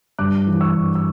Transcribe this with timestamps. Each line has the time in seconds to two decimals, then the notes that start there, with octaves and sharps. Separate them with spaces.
0.19 G2 D6 F#6
0.46 E3
0.61 C#6 E6
0.75 G2
0.95 E6